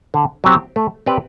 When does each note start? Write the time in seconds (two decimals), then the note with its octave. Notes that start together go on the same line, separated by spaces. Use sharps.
0.14 D3
0.44 F#3 C4 G4
0.76 A3
1.06 C4 G4 B4 D5